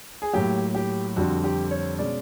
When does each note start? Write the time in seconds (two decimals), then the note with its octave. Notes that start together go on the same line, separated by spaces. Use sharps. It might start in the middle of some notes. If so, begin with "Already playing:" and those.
0.22 G#4
0.33 A2 F#3 A#3 G4
0.75 G4
1.16 F2 D3 G3 C4 F#4
1.44 G4
1.71 C#5
1.98 B2 G#3 C#4 D5